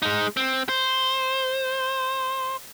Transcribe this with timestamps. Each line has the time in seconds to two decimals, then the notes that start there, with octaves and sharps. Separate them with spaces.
0.02 G#3 D#4
0.37 C4
0.69 C5